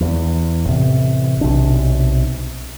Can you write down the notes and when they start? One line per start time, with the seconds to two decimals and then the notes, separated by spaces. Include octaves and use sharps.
0.01 E2
0.66 A1 C3
1.41 B1 C3 D4